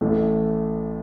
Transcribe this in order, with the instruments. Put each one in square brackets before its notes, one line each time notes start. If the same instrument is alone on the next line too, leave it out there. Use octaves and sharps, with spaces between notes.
[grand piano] A1 A2 E3 A3 E4